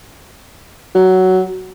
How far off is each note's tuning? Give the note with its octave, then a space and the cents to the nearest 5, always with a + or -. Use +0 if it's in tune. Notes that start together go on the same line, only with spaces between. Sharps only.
F#3 +10